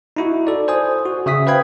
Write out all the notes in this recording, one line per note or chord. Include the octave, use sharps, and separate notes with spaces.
D#4 E4 F#4
A4 D5
C5 G#5 D#6
F#4
C#3 E5 D#6 B6
B4 C5 F5 G5 B5 G#6